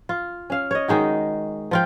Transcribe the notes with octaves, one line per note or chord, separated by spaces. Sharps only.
F4
C#4 F5
C#5 D#5
D#3 G#3 D#4 F#4
F3 F4 G5